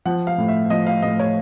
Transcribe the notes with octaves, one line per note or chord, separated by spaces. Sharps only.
F3 F#5
F5
A2
E5
F3 D#5
F5
A2 D#5
C#5